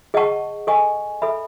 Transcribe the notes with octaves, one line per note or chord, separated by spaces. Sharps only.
G#4 D#5 F#5 A5 C#6
A4 D#5 G#5 C#6
A4 E5 B5